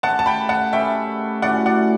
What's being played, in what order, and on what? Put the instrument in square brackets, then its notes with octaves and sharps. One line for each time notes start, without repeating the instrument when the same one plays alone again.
[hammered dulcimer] A3 C#4 G4 [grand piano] F#5 A5
[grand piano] A5
G5 B5
F#5 A5
[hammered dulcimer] A3 C#4 G4 B4 [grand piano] E5 G5
[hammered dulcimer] A2 F#3 C#4 [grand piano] D5 F#5
[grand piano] D5 F#5